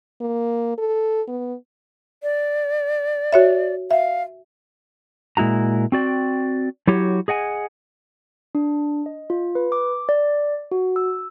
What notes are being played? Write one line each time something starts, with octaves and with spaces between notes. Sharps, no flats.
A#3
A4
B3
D5
F#4 C#5 E5
E5 F5
A#2 G#3 E4 F#4 A#5
C4 F#4 D5 G5
F#3 E4 F#4 G4 C#5
G#4 D#5 F#5 G#5
D4
D#5
F4
B4
D6
D5
F#4
E6